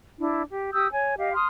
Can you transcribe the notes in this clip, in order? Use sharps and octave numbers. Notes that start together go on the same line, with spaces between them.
D4 E4
G4
G4 D#6 E6 G6
C#5 G#5
G4 D#5 F5
C6 D#6 F6